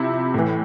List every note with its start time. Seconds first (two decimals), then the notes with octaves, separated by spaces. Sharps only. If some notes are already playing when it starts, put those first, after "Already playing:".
Already playing: C3 F3 E4
0.34 A2 E3